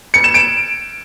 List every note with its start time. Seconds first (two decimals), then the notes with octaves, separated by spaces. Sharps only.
0.14 C#7
0.24 E7
0.34 D7